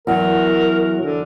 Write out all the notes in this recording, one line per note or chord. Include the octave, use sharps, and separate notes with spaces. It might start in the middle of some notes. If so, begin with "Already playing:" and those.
E2 F#3 A#4
D3